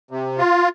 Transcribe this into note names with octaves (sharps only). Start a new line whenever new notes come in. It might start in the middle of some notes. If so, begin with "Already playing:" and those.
C3
F4